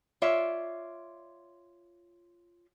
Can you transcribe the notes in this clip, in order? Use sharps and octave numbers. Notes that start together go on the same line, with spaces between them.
F4 C#5 D5 E5